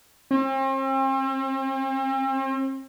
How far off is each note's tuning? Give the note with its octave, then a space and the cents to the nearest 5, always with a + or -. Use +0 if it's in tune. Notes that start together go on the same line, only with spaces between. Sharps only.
C4 +40